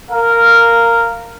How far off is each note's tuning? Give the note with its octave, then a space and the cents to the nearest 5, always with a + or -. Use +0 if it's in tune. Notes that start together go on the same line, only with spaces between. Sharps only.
A#4 -10 F5 -5